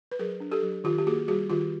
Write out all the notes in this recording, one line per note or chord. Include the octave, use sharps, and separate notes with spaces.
B4
F#3 G#4 A#4
D4
G4 A4
F#3
D#3 F4 G4
G4
A#3 F#4 G#4
G3 F#4 G#4
D#3 F4 G4